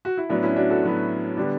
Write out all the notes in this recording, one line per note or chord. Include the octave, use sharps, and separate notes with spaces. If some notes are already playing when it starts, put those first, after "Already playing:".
F#4
E4
A2 F#3 B3 D4
C#4 E4
D4 F#4
F#4 A4
A2 F#3 B3
D3 G3 B3 D4